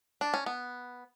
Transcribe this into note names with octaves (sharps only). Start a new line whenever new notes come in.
D4
C#4
B3